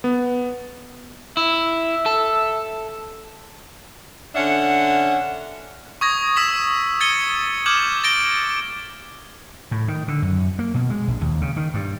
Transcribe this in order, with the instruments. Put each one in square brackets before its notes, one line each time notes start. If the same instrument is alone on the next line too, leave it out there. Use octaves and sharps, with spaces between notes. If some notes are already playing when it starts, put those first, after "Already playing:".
[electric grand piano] B3
[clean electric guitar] E4 [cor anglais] E5
[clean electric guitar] A4
[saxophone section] D3 C#4 D4 E5 F#5
[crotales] C#6 D#6 G#6 A#6
C#6 E6 G#6 B6 E7 F#7
G#6 A6 C#7 D#7 G7
D6 F6 G6 G#6 E7 F#7
A6 A#6 D7 G7
[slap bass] A2
D#3
D3
F#2
A#3
B2
G#3
A#1
D#2
C#3
D#3
G2